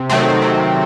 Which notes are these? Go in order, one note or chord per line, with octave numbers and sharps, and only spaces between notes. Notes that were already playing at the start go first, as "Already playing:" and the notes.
Already playing: C3
D#3 F#3 A3 C4
C3